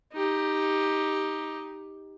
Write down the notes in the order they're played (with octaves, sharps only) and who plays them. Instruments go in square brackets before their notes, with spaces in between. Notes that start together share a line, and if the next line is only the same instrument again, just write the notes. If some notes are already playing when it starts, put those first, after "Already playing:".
[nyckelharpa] D#4 G4